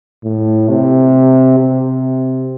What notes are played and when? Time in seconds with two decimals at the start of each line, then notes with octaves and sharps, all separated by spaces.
0.24 A2
0.69 C3
1.59 C3